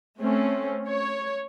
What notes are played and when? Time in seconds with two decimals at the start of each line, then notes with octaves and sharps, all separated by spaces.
0.20 A3 C4 C#4
0.87 C#5